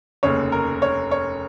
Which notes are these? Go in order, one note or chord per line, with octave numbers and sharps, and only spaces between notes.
F1 D#2 C#3 C#5
A#4
C#5
C#5